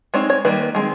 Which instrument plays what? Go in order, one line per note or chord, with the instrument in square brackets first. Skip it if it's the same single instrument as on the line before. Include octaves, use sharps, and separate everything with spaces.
[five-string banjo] G#3 C4 D#4 C#5
C#5
D#3 G3 A#3 B4
D#3 G#3 C4